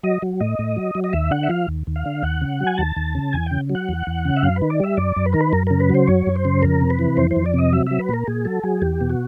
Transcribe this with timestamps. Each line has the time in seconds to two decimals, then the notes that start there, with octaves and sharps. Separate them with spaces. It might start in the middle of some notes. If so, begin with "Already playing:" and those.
0.03 F#3 D#5
0.22 F#3
0.40 A2 D#5
0.59 A2
0.76 F#3
0.95 F#3
1.04 D#5
1.13 D#2 E5
1.31 D3 F#5
1.43 E5
1.49 F3 F5
1.68 D#2
1.87 D#2
1.96 F5
2.06 D3
2.23 D#2 F#5
2.41 C#3
2.60 F#3
2.67 G#5
2.78 D#2 A5
2.96 D#2
3.15 C#3
3.33 E2 G#5
3.46 C#3 G5
3.69 F#3
3.75 F#5
3.89 E2
4.07 E2
4.25 C#3
4.36 E5
4.43 F#2 F5
4.56 B4
4.62 D#3
4.70 D5
4.80 G3 E5
4.97 F#2 D5
5.16 F#2
5.26 B4
5.33 D#3 A#4
5.41 B4
5.53 F#2 A#4
5.67 C#3 A#4
5.80 B4
5.89 F#3 C5
6.07 F#2 C#5
6.27 F#2
6.36 C5
6.45 C#3
6.62 F2 A#4
6.81 C3
6.90 B4
6.99 E3
7.17 F2 C5
7.31 C5
7.36 F2
7.46 D5
7.54 C3 D#5
7.73 F#3 E5
7.87 F#3 E5
7.99 B4
8.09 A#2 A#4
8.27 A#2 G#4
8.45 F#3 A4
8.63 F#3 G#4
8.82 E2 G4
9.01 B2
9.10 F#4